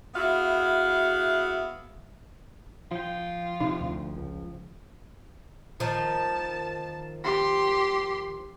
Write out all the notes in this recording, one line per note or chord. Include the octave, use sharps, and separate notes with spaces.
B3 E4 F#4 G#4 E5 F5
F3 F4 G5
C3 D#4
D2
C#2
D#3 F3 A5
G4 C6